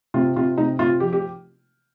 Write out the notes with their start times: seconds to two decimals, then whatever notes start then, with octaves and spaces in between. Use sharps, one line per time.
0.14 C3 F4
0.36 C3 F4
0.58 C3 D#4
0.79 C3 F4
1.00 F3 G4
1.13 G4